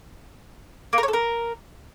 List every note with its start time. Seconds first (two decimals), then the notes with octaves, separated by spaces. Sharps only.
0.93 A#3
0.98 A#4
1.03 C#5
1.08 A4
1.13 A#4